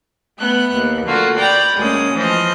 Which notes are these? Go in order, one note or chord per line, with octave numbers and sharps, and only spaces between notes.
A3 B3 F#6
D#2
D3 A3 A#3 F4 F#4
D5 G5 A#5 B5
D2 G#3 A#3 C#4 D#6
E3 F3 C5 D#5